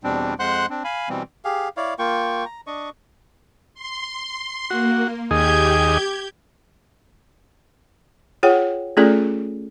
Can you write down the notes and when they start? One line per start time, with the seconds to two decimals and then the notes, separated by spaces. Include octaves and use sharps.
0.04 E2 B2 G3 C4 D4
0.39 F2 G#3 C5 F#5 C6 F#6
0.70 C4 D4
0.84 F5 G#5 B5
1.09 B2 E3 G3 C4
1.44 G4 G#4 F5
1.77 E4 C#5 D5 F5
1.99 A#3 F4 G5 C#6
2.46 A#5
2.67 D4 D#5 C#6
3.74 C6
4.70 A#3 F#4
5.31 D#2 G4 G#4 D#5 G6 G#6
8.43 F4 G#4 C#5 F#5 G5
8.97 A3 C#4 F4 G#4 A4 D5